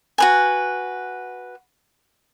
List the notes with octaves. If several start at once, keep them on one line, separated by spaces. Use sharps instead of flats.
F#4 B4 G#5